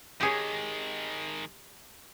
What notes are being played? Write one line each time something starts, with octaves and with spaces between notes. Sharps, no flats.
D#3 G#3 G4 G#4 C#5